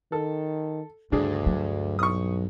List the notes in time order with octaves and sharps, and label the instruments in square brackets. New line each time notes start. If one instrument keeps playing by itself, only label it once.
[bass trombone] D#3 [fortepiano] A4
[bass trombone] D2 [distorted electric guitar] G2 [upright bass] C#3 [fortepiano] D4 G#4
[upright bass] F#3
[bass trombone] B1 [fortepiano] C#6 D#6